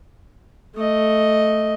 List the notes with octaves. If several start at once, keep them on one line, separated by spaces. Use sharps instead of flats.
A3 D#5